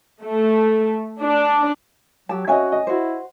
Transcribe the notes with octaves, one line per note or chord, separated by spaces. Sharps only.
A3
D4
F#3 G4 A5
C#4 F#4 D#5 E5 G#5
D#5
E4 F#4 C5